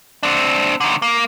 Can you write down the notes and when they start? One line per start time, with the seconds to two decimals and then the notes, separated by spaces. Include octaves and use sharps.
0.23 C4 D4
0.81 D3 D#3
1.02 A#3